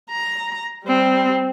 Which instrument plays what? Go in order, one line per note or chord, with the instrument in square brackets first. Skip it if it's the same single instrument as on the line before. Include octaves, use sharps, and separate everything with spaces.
[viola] A#5
G3 C4